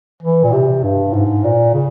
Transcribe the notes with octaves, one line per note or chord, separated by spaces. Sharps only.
E3
A#2
C3
G2
G#2
A#2
C#3